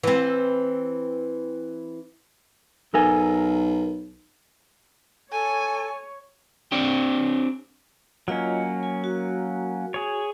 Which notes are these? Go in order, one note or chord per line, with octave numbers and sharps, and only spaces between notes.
E3 C4
B1 A4 A#4 G#5
A4 C#5 G#5
C4 D4 G4
F#3 A#3 C#4 F4 D#5
G#5
F#4
G#4 C#5